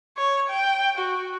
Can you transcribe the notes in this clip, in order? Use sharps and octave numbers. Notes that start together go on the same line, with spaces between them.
C#5
G5
F#4